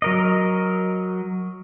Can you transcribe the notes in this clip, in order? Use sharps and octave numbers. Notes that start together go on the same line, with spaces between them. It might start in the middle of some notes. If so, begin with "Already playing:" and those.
F#3 A#4 D#5